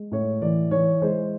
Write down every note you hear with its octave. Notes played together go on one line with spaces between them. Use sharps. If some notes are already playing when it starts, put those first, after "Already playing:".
Already playing: G#3
A2 C#5
E3 D5
E3 C#5
G#3 C5